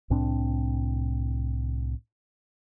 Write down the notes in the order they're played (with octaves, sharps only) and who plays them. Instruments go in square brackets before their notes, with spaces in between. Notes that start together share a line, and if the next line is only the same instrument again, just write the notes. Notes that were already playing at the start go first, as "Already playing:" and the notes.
[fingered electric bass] C2 A2 C4 D4